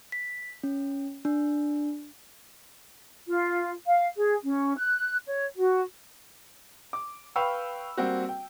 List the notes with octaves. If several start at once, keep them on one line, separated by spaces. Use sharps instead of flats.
B6
C#4
D4
F4
F5
G#4
C#4
F#6
C#5
F#4
D6
B4 F5 G5 B5 C#6 E6
G3 A#3 C4 F#4
G5